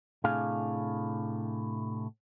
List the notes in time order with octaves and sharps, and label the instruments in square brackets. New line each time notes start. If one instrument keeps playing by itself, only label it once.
[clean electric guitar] A2 C3 D4 G#4 F5 G#5